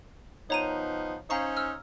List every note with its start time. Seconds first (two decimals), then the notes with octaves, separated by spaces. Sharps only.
0.50 F3 B3 D#4 C#5 A#5 D#7
1.30 C#4 D#4 C5 F5 A#5 C#6
1.57 E6 F6